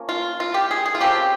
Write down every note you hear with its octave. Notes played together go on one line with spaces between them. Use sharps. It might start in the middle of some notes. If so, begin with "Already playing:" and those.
Already playing: F3 A#3 C#4
F4
F4
G4
G#4
G#4
F4
C#3 F3 C4 G4